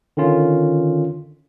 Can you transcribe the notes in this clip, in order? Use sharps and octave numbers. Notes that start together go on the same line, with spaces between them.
D3 D#3 C#4 F4